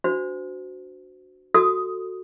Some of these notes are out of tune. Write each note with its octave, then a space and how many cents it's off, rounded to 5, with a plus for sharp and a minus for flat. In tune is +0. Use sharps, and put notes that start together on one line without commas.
D4 +0 F#4 +0 C5 -25
F#4 +0 A4 +15 D#6 +0